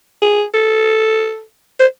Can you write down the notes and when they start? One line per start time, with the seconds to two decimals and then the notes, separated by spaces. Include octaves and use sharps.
0.22 G#4
0.54 A4
1.80 C5